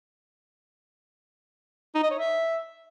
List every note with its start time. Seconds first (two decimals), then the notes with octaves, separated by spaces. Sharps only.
1.95 D#4
2.03 D#5
2.11 C#5
2.19 E5